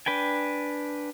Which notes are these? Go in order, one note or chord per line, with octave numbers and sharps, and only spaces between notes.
D4 B4 G5 G#5